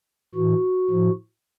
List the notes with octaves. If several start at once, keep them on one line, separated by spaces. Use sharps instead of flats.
A2 E3 F#4
A2 F3